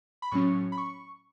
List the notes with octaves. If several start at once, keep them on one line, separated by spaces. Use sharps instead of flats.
B5
A2 F#3 C#4 C#6
B5
C#6